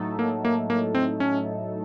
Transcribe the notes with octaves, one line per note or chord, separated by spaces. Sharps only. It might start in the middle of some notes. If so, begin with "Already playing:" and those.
Already playing: A2 F#3 A3 D#4 A4
A#3
A#3
A#3
C4
C#4